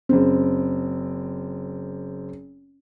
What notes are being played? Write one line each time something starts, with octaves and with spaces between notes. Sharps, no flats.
F#1 C4